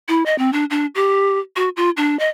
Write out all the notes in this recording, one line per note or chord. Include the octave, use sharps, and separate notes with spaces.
E4
D#5
C4
D4
D4
G4
F#4
F4
D4
D#5